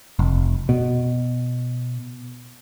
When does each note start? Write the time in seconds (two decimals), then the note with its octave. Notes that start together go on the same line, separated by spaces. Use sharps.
0.19 F1
0.69 B2